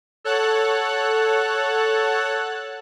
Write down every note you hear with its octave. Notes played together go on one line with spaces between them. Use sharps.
A4 C#5 F#5 A5 F#6